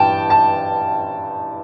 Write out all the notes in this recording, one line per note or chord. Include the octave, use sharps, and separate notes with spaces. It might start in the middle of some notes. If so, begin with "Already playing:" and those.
Already playing: G2 E3 G5 A5
A5